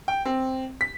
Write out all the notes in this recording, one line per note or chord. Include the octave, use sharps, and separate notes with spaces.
G5
C4
B6